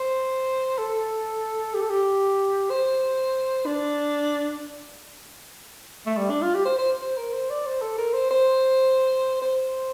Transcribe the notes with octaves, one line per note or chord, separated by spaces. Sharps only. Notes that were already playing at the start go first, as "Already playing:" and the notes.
Already playing: C5
A4
G4
A4
G4
C5
D4
A3
G3
D4
F4
G4
C5
C5
C5
A#4
C5
D5
C5
A4
A#4
C5
C5
C5